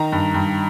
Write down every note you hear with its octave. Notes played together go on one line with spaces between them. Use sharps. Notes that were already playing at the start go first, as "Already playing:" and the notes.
Already playing: D#3 A#5
G2
G2